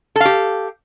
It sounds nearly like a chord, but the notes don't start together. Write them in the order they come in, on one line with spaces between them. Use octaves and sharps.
A4 F5 G4